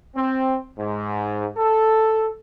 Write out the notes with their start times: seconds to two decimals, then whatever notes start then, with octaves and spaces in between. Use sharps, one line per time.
0.15 C4
0.78 G#2
1.57 A4